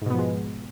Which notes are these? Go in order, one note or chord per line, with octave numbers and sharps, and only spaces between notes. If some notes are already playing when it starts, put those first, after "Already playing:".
G#2 B2 F3 G#3 B3